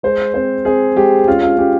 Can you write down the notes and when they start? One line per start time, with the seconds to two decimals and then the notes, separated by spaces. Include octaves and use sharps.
0.03 G#3 C5
0.34 C4 C5
0.65 C4 G#4
0.96 G#3 G4
1.27 C#4 F4
1.43 F4
1.58 C#4 G4